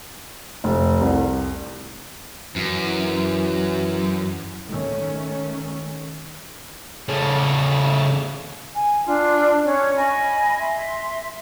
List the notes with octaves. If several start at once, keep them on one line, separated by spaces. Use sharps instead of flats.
F1
C2
F#2 E3
D#3 A3 C#4
C#3 A3
G#5
D4 F4
C#4 C#5
D#5 G#5 B5
E5 C6